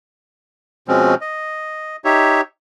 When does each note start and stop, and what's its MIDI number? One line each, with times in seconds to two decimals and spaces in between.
0.88 1.15 47
0.88 1.15 53
0.88 1.15 56
0.88 1.15 60
0.88 1.15 61
1.21 1.96 75
2.05 2.41 63
2.05 2.41 67
2.05 2.41 73
2.05 2.41 76